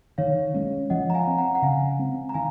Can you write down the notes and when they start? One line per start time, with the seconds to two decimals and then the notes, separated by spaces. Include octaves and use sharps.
0.18 D#3 C#5 F5
0.54 G#3 C#4
0.90 F3 D#5 F#5
1.10 A#5
1.14 F5 G#5
1.27 C4
1.38 F#5 A#5
1.55 F#5
1.62 C#3 F5 G#5
1.99 G#3 C4
2.29 A#5
2.34 D#3 F5 G#5